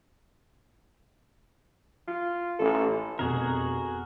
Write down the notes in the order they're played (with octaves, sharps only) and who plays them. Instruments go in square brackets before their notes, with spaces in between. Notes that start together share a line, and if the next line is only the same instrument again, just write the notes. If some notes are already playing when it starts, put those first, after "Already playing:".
[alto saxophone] F4
[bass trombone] A1 [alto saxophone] A4
[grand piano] F1 B2 E7 [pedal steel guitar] F#4 G#4 A#4